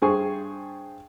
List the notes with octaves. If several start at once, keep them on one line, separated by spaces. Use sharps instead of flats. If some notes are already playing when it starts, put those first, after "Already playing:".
G2 G#4 C5 G#5 C#6